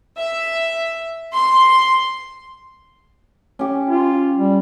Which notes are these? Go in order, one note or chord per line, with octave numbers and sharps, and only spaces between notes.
E5
C6
C#4 G4
F4
G3